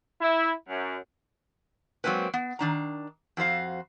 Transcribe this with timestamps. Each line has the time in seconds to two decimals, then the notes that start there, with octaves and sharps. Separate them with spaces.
0.21 E4
0.69 F#2
2.04 F#3 G#3 A#3 C4 B4
2.34 B3
2.59 D#3 D4 A#5
3.37 F2 F#4 C5 F5